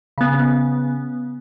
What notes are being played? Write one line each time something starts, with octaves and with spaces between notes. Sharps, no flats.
C#3 B3